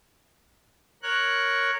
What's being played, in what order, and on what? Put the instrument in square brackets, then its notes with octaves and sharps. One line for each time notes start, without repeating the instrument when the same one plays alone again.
[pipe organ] A#4 C#5 F#6